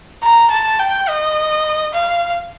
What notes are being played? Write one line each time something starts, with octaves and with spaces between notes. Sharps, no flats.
A#5
A5
G5
D#5
F5